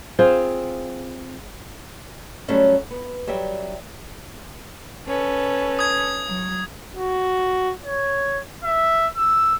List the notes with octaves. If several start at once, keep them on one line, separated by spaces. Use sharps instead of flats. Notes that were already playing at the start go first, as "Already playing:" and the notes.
C4 F4 G#4 C5
F#3 G3 A3 C#4
B3
F#3 G3 G4 E5
C#4 A4 B4
D#6 G#6
F#3
F#4
C#5
E5
E6